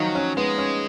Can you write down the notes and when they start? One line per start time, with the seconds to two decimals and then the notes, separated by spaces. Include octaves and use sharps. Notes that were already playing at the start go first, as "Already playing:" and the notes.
Already playing: D#3 F3 F#3 D#4 F4
0.15 C#4
0.37 G#3 B3
0.58 C#4